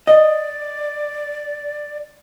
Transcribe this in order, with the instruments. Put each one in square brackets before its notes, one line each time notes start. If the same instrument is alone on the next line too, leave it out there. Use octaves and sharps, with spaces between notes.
[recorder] D5 [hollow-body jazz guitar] D#5